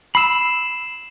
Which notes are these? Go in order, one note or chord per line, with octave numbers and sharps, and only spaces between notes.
B5 E6 C7 E7